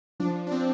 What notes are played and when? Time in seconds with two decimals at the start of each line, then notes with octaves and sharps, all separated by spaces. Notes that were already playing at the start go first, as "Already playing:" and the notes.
0.20 F3 D4
0.36 F3
0.47 D4
0.51 F3 C4